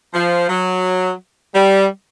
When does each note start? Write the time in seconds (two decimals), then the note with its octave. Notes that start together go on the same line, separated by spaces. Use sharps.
0.14 F3
0.49 F#3
1.54 G3